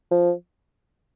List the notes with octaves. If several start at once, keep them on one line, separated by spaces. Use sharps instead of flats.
F3